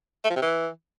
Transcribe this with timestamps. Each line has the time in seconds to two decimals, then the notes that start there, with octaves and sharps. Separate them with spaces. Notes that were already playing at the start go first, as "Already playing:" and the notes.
0.24 A3
0.30 F3
0.36 C3
0.42 E3